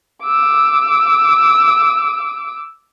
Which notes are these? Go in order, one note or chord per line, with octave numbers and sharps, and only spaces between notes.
D6 E6